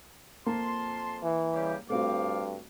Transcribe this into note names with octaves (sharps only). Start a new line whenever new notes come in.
F2 A#3 A5 C6
E3
C#3 G3 G4
G2 F3 A3 C4 F#4 F5 D6